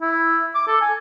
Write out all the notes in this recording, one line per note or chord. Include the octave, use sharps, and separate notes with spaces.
E4
D6
A4
G#5